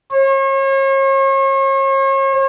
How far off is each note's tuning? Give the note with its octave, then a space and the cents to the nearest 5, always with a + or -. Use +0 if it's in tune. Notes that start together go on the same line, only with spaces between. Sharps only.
C#5 -40